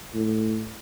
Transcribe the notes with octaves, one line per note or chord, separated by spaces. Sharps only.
A2